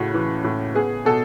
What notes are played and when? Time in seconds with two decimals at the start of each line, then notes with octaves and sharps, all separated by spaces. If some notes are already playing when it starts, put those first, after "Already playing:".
Already playing: A2 C#3 F#4
0.14 E3
0.44 A2
0.74 B3 G#4
1.05 B2 A4